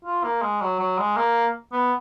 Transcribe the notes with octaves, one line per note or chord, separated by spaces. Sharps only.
F4
A#3
G#3
F#3
F#3
G#3
A#3
B3